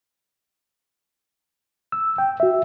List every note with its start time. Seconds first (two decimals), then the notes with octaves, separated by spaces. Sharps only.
1.92 E6
2.18 G5
2.40 F#4 E5